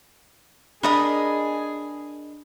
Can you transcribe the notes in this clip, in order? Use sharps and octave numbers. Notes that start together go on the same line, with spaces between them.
D4 G#4 A#4 D#5 B5